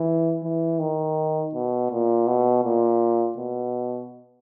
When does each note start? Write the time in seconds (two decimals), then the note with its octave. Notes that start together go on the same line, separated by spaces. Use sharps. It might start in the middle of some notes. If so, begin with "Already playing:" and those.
Already playing: E3
0.43 E3
0.80 D#3
1.54 B2
1.91 A#2
2.27 B2
2.64 A#2
3.38 B2